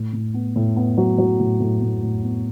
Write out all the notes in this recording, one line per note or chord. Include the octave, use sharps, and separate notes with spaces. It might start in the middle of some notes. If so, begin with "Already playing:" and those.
Already playing: A2
A2
B3
A2
B3
F#3
F#3
A2
A2
A2
A2
B3